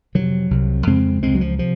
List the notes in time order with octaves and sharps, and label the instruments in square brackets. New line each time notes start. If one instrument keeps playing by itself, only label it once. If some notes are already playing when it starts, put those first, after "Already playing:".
[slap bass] F2 C3 D#3 F#3
C2 C3
F2 C#3 G#3 C4
C#2 C#3 G#3 C4
F#3
F3
C3 F3